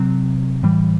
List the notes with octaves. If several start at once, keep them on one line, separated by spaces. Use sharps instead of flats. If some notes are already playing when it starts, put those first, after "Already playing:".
Already playing: C3 F#3 C4
A2 E3 G3